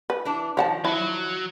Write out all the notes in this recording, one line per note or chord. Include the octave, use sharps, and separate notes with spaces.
B4
E3 D4 A5
D#3 F3 C#5 F#5 A5
F#3 E4